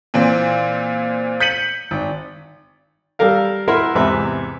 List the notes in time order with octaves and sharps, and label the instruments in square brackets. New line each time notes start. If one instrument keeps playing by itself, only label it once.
[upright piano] A#2 E3 C4 C5
G6 B6 C#7 D#7 F#7
G#1
[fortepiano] G3 A4 A#4 F5
E4 A#4 B4 E5 F#5 C6
E2 G#2 C3 B4 E5